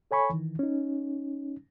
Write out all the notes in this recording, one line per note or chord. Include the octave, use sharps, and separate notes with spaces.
A4 C#5 G#5 B5 C#6
D#3 E3
C#4 D#4